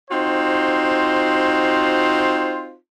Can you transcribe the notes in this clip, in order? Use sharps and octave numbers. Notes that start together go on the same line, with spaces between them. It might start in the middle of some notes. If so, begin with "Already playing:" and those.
C4 D#4 F4 F#4 C5